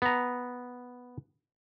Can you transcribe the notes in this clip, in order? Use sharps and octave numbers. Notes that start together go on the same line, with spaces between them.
B3 A#5